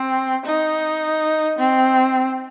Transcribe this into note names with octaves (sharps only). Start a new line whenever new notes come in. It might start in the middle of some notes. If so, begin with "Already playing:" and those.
Already playing: C4
D#4
C4